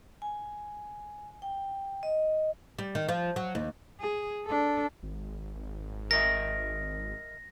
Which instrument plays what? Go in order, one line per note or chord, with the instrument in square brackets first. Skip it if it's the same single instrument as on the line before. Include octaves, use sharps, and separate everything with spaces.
[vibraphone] G#5
G5
D#5
[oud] G3
D#3
F3
F#3
D#2
[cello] G#4
D4 A4
[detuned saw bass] G#1
[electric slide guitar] A#4 D#5 E5 [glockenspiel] A#6